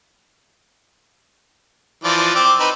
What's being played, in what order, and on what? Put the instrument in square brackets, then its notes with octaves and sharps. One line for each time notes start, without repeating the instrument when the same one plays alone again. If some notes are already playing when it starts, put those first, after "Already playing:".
[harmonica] E3 F3 D5
C4 D6
C4 D#4 B4